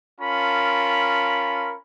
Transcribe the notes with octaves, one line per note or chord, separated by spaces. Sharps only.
C#4 F4 A#4 A5 B5